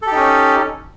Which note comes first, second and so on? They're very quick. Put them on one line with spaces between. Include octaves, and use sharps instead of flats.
A4 G4 D#4 C#4